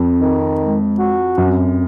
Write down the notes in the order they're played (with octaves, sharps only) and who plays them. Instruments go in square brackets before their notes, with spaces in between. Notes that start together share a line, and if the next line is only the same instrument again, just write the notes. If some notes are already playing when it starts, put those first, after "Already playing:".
Already playing: [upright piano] F2 [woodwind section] C4
[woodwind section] D#3
G#3
F#4
[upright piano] F#2 [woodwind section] C4